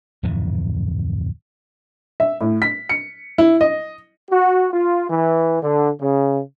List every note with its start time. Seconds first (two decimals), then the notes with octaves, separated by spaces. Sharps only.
0.23 D1 F2 G#2 E3
2.20 E5
2.41 A2
2.62 B6
2.89 C#7
3.38 E4
3.61 D#5
4.31 F#4
4.72 F4
5.09 E3
5.62 D3
6.00 C#3